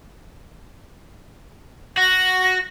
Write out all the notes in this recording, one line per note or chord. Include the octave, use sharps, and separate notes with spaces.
F#4 A#6